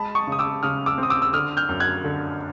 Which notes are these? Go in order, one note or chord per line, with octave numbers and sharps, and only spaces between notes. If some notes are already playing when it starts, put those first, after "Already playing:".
Already playing: G#3 A5 B5
C#6 D#6
C#3 D#6
D6 E6
C#3 D#6 F6
D6 E6
C4
D#6
D6 E6
E6
D3 D#6 F6
F6 G6
F#2
F#6 G#6
D3